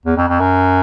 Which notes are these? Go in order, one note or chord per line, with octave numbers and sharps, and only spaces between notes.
E2
F2
F2
F#2